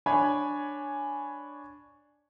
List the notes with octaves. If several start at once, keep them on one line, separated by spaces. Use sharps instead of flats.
D4 C#5 G#5 B5